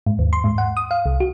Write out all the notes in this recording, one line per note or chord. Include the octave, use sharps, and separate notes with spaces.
G#2
D#2
C6
G#2
F#5
D#6
F5
C2
F#4